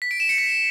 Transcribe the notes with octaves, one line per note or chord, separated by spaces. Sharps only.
B6
D7
E7
C#7
B6